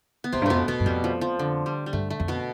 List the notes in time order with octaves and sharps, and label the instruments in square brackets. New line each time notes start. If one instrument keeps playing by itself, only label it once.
[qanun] B3
[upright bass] E2 [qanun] C3 C4
[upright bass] G2
[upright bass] F2 [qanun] B2 A3 B3
[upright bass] F2 [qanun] B2 B3
[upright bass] G2
[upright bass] F2 [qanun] G3
[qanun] F3
F3
D3
G3
G3
[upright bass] G2 [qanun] A3
[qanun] A3
[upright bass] F2
[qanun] B2 B3